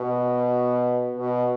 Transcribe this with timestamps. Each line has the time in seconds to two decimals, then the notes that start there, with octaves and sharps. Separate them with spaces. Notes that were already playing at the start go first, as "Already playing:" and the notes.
Already playing: B2
1.17 B2